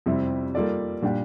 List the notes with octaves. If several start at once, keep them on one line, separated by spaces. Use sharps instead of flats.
F2 C3 G3 C4 E4
G3 A#3 F4 A4 D5
A#2 G3 D4 G4